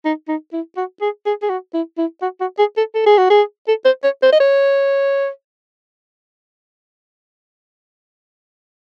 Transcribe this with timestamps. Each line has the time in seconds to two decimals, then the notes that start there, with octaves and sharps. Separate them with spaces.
0.05 D#4
0.28 D#4
0.53 E4
0.77 F#4
1.01 G#4
1.26 G#4
1.42 G#4
1.49 F#4
1.74 E4
1.98 E4
2.22 F#4
2.41 F#4
2.59 G#4
2.77 A4
2.95 A4
3.06 G#4
3.18 F#4
3.30 G#4
3.68 A4
3.85 C5
4.04 C#5
4.23 C5
4.33 D#5
4.40 C#5